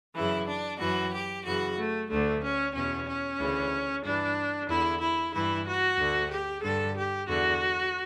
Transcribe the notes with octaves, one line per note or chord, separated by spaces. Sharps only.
F#2 C#3 E3 E4
D4
F#2 E3 F#4
G4
F#2 C#3 E3 F#4
A3
D2 D3 A3
C#4
E2 B2 C#4
C#4
D2 C#3 E3
G2 E3 D4
E2 D3 E4
E4
G2 E3 E4
F#4
D2 D3
G4
G2 D3 A4
G4
E2 D3 F#4